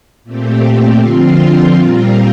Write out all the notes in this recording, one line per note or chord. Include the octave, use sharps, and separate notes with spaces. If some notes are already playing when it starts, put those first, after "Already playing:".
A#2 A3 C4 G4
D3 F3 C4 F4 C5
A#2 G3 C4 F4 A#4